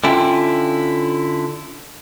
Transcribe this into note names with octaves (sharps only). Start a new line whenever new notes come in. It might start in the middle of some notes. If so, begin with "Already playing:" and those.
D3 C#4 E4 F4 G5